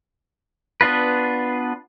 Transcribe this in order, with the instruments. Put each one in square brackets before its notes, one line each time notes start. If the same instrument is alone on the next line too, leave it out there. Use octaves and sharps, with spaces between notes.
[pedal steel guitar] B3 D4 F4 B4